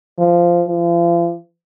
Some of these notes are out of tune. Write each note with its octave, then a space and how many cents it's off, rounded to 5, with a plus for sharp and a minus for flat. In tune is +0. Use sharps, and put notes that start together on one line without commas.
F3 -10
F3 -40